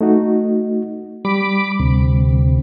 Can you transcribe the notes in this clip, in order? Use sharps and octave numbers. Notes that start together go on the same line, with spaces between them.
A3 D#4 F#4
G3 B5 D6
D2 C3